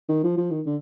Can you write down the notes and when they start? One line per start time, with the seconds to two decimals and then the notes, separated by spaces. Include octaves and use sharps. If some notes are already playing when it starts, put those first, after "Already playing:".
0.09 D#3
0.24 F3
0.38 F3
0.51 D#3
0.66 D3